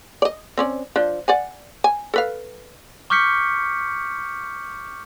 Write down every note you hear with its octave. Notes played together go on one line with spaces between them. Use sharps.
D5 D#5
C4 C#4 D5
F3 D4
D5 F#5 G#5
G#5
A4 B4 F5
C#6 D6 F6 G6 B6 C#7